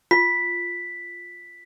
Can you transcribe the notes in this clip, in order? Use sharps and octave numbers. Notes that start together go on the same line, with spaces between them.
F4 B6